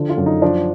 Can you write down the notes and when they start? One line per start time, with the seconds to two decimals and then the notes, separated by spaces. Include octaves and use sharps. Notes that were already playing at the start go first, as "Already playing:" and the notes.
Already playing: D3 F3
0.09 F4
0.18 F#2
0.26 D#4
0.42 F3 D4